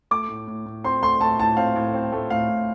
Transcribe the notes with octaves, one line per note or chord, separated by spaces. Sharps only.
A3 D6
A2
A2
A2
C4 C6
A3 C6
A3 A5
A2 A5
C4 F5
A2
C4
A3
A2 F5
A2